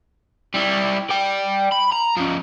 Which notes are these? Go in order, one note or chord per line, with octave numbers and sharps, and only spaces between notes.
G3 E4
D5 G5
B5
A#5
F3 C#4